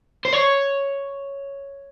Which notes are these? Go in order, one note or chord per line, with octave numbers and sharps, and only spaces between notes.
C5
C#5